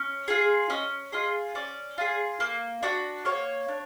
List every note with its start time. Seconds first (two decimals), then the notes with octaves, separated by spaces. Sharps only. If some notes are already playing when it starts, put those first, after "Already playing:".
Already playing: C#4
0.28 F4 G#4
0.70 C#4 D#5
1.12 F4 G#4 D#5
1.55 C#4 D5
1.98 F4 G#4
2.40 A#3
2.83 D4 F#4
3.25 A#3 C#5
3.68 D4